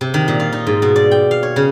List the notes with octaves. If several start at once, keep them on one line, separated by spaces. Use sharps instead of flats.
C3
D#3
A#2
F4
D#4
G#2
B2
D5
G5
F5
C#5
C#3